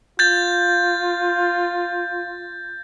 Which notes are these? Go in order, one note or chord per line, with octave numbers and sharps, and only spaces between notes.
F4 G6 A6